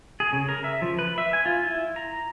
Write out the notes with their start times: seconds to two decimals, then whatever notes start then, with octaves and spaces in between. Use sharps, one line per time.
0.20 G#4
0.33 C#3
0.49 A#4
0.64 E5
0.82 F3
0.99 B4
1.18 E5
1.33 G#5
1.46 F4
1.65 E4
1.96 A#5